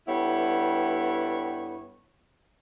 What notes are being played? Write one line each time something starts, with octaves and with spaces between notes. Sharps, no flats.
G2 G3 B3 E4 A4 C#5